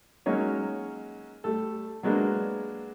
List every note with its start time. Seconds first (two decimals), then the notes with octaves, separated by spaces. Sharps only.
0.26 F#3 G#3 A#3 C#4 D#4
1.44 G3 A3 A4
2.03 F#3 G#3 A#3 B3 D4